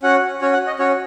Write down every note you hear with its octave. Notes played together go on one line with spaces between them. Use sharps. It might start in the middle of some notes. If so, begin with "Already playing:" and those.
C#4 F#4 F#5
C#4 F#4 C#5
F#5
D#5
C#4 F#4 C#5